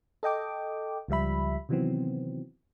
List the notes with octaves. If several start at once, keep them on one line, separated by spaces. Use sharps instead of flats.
A4 D#5 G5 D6
C#2 F3 G3 E5 B5
C3 D#3 E3 F#3 B3 C4